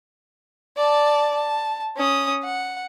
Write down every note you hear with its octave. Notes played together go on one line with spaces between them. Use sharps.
D5 A5
A5
C#4 D#6
F#5